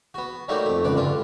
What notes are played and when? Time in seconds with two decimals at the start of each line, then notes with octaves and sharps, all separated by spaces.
0.14 B3 F#4
0.48 F#3 G3 A3 A#3 D#4 F#4
0.65 F2 A3
0.85 C#2 F#2 B4 D5
0.97 G2 D3 F4